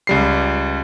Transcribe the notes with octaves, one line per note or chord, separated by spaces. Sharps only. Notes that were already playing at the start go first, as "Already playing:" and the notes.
C#2 G3 C7